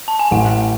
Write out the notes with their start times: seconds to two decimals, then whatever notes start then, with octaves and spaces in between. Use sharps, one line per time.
0.08 A5
0.19 G#5
0.31 A1 F#5